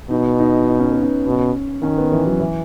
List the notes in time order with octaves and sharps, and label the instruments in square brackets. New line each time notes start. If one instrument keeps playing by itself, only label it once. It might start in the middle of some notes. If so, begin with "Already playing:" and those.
[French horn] B2 [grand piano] D#4
[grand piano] D#4
D#4
C#4
B3
C#4
[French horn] B2
[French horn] D#3 [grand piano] C#4
[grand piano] B3
E3
F#3
E3